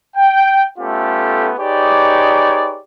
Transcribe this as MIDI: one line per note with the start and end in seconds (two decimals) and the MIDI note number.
0.16 0.68 79
0.79 1.52 57
0.79 1.52 59
0.79 1.52 61
0.79 1.52 65
0.79 1.52 67
0.79 1.52 69
1.59 2.80 63
1.59 2.80 67
1.59 2.80 68
1.59 2.80 71
1.59 2.80 73
1.59 2.80 74